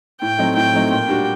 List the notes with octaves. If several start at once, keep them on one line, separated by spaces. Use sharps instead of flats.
A2 G5
F#3 A3 C4 D#4
A2 G5
F#3 A3 C4 D#4
A#2 G5
G3 D4 F#4